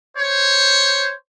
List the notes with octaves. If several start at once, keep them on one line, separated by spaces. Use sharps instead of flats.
C5 C#5